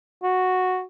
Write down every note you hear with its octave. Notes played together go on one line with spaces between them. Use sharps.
F#4